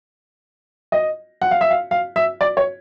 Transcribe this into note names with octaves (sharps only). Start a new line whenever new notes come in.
D#5
F#5
F5
E5
F5
F5
E5
D5
C#5